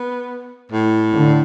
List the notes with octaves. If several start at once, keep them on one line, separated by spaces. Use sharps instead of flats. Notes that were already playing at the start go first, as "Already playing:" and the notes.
Already playing: B3
A2
D3